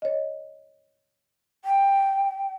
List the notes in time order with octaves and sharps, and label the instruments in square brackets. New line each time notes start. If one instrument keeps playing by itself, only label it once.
[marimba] C#5 D#5
[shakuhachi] G5